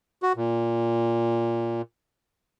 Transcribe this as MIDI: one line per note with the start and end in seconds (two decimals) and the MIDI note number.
0.23 0.33 66
0.36 1.82 46